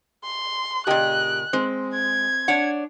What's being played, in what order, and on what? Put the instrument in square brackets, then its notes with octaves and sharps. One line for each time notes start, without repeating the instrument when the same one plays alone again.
[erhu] C6
[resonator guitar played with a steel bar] A#2 C#3 [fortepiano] G4 D#5 G5 [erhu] F#6
[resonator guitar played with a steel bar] G#3 [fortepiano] C4
[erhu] G#6
[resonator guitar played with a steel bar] D4 C#5 F#5